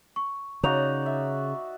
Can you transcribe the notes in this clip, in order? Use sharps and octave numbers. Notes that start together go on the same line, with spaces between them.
C#6
C#3 D#4 F#4 C#5 D5 A#5 F7
E5